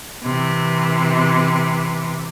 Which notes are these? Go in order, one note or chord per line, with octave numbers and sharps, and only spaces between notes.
C3 E3